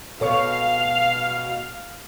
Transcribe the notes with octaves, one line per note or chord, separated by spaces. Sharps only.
B2 A4 C#5 F5 C#6